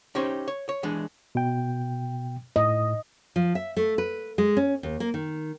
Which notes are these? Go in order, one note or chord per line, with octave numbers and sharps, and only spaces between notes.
C#4 D#4 G4 C5 C#5
C#5
C#5
D#2 E3 G#3 D4
B2 G5
A2 D#5
F3
E5
A3
B4
G#3
C#4
D#2
A#3
D#3